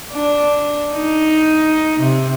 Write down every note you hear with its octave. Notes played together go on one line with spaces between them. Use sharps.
D4
D#4
C3